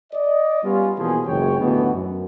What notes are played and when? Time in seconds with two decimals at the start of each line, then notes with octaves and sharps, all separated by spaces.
0.13 D5 D#5
0.64 G3 B3 C#4 F4
0.98 B2 E3 F3 A#3 B3 G#4
1.26 F#1 C#2 C#5 G5
1.59 A1 D2 B2 D3 E3 B3
1.94 F#2